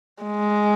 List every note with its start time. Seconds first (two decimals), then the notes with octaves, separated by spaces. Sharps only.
0.23 G#3